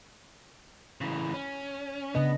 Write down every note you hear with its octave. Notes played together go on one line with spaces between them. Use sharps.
C#3 E3
C#4
C#3 B3 D4 D#5